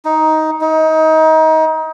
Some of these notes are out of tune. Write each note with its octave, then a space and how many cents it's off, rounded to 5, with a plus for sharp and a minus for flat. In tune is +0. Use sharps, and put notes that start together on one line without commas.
D#4 +10
D#4 +25